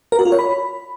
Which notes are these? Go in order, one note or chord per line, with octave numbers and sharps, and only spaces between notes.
A#4
F#4
F4
C#5
B5